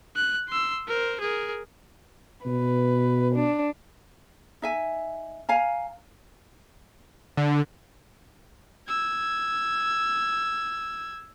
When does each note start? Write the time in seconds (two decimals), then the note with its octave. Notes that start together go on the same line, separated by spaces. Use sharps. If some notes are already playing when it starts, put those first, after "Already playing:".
0.16 F#6
0.49 C6 E6
0.88 A#4 C5
1.20 G#4 A#4
2.46 B2 B4
3.35 D4
4.62 D#4 E5 G#5
5.49 F5 G#5 A#5
7.37 D3
8.88 E6 G#6